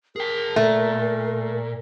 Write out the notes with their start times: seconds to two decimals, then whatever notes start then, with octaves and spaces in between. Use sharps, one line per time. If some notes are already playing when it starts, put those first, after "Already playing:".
0.16 G#4 A#4 G5
0.56 A#2 A3